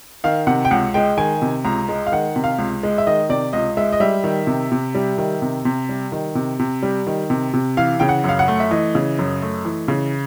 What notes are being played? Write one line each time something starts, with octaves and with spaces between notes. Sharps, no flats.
D#3 F5
C3 F#5
G5
C#2 F#5
G#3 G5
D#3 G#5
C3
C#2 A#5
G#3
F5
D#3 F#5
C3
F5
C#2
G#3
E5
D#3 D#5
C3 D5
C#2 D#5
G#3 E5
D#5
G3 E5
D#3
C3
C3
G3
D#3
C3
C3
G3
D#3
C3
C3
G3
D#3
C3
C3
E3 F5
C#3 G5
F#5
F#2 F5
F#5
A3
E5
E3 D#5
C#3
F#2
A3
E3
C#3